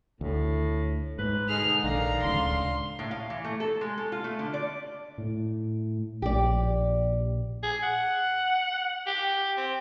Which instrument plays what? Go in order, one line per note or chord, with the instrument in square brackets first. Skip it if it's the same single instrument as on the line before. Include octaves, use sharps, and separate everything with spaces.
[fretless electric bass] D2 [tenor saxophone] A2
[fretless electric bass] G#2 [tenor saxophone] B4
[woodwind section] B2 D3 D#4 [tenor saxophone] G#4 [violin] F6
[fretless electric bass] A#1 D#3 [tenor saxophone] D3 [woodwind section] D5 F5 [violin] A#5
[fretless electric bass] D1 C#2 C#3 [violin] C6
[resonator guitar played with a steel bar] A2
F5
E3
A3
A4
G#3
A4
F4
A3
D3
D5
[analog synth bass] A2
[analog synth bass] A#1 [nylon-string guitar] G4 D5
[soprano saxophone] G#4
F#5
G4
C4